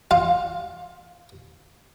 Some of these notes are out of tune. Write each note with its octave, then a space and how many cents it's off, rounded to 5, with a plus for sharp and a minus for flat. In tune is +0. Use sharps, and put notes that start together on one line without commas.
F4 +5 F5 +20